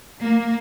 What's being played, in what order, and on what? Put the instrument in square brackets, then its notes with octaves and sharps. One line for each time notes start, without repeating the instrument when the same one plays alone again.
[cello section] A#3